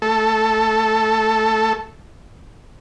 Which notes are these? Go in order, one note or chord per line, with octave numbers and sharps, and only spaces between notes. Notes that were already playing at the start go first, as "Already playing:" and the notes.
A3 A4